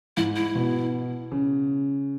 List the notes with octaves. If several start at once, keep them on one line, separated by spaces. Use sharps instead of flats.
G#2 E4
E4
B2
C#3